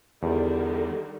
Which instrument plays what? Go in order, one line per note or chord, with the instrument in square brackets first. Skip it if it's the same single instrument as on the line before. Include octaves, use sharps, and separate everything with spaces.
[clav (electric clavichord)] E2 [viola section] D3 D#3 G3